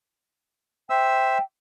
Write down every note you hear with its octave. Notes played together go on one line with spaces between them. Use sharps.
C5 E5 G5 E6